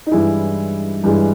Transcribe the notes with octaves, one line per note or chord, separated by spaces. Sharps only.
D#4
G2 E3 G#3 E4
G2 E3 G#3